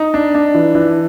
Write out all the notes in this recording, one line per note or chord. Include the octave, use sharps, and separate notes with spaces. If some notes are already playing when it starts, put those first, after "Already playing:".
Already playing: D#4
D4
D4
E3
E3